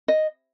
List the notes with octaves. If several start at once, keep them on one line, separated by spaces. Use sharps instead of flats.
D#5